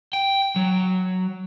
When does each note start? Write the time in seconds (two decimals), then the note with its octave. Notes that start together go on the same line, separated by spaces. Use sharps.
0.13 G5
0.56 F#3